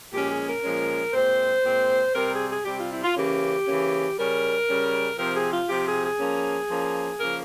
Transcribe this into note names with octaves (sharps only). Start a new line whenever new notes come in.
A#2 F3 G#3 C#4 G4
G#4
A#4
A#2 F3 G#3 C#4
A#2 G#3 C4 C5
A#2 G#3 C4
C3 G3 C4 A#4
G#4
G#4
C3 G3 C4 G4
F4
E4
F4
C#3 E3 A#3 C#4 G4
C#3 E3 A#3 C#4
C#3 G3 C#4 A#4
C#3 G3 C#4
C3 F3 C4 A#4
G#4
F4
C3 F3 C4 G4
G#4
G#4
F3 A#3 C#4
F3 A#3 C#4
C#3 F3 A#3 A#4